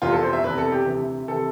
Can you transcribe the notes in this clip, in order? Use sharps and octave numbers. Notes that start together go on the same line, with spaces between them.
F1 E2 C3 F4
A4
C5
E5
F1 E2 C3 B4
A4
G4
D2 C3 E3
C3 E3 A4